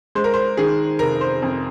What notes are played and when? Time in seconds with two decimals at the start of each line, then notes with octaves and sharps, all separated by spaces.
0.15 G#3 C5
0.24 A#4
0.34 C5
0.57 D#3 G#4
0.99 F1 A#4
1.21 C5
1.42 F2